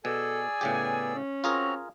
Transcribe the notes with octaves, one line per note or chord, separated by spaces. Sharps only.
B2 G#4 A4 D5 G#5 E6
A2 C#3 B3 G4
C#4
C4 F4 F#4 G#4 A#4 A#5